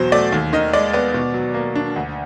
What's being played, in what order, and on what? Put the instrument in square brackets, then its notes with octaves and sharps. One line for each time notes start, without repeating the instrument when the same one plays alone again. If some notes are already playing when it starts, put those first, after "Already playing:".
Already playing: [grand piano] E2 B2 F#3 C5
A3 D5
D#2
D#3 D#5
G#3 D5
B3 D5
B2
F#3
A#3
D4
D2